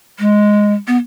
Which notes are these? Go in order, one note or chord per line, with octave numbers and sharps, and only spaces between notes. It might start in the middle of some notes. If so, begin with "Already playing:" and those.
G#3
B3